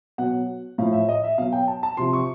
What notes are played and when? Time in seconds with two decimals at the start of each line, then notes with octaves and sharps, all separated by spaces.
0.18 B2 F#3 F#5
0.78 A2 F3 F5
0.93 E5
1.09 D#5
1.24 E5
1.38 B2 F#3 F5
1.52 G5
1.68 A5
1.83 A5
1.97 C3 F3 C6
2.13 C#6